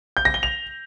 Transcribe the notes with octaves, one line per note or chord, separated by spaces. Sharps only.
G6
A#6
G7
F7